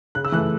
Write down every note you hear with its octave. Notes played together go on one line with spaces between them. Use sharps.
C#3 F#6
E6
E3 A3 F#6